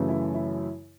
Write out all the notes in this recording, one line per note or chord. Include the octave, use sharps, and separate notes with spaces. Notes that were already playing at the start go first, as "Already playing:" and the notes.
Already playing: F#2 C#3 E3 A3
E4
E4